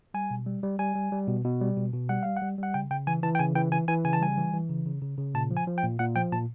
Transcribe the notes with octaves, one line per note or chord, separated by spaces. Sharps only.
G3 G#5
B2
G3
G3
G3 G#5
G3
G3
B2
B2
G3
B2
B2
G3 F#5
G3 F5
F#5
G3
G3 F#5
C#3 G5
C#3 G5
E3 G#5
E3 A5
G5
C#3 G#5
E3 G5
E3 G#5
E3 G#5
C#3 G#5
A5
G3 G#5
E3
E3
C#3
C#3
C#3
C#3
A#2 A5
F3
G#5
F3
G5
A#2
A#2 F#5
F3 G5
A#2 A5